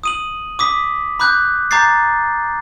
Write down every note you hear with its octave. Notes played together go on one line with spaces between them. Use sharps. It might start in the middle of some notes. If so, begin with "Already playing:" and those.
D#6 D#7 F#7
D6 D#6 B6
B5 D6 F#6 G6
A#5 D6 G6 A6 C7